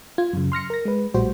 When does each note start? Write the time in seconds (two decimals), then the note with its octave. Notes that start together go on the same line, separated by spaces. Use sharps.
0.18 F4 G#6
0.33 F#2 C#3
0.52 C6 F6 A#6 C#7
0.70 A#4 A#6
0.85 G#3 B4
1.14 A#1 A2 G3 F#4 C5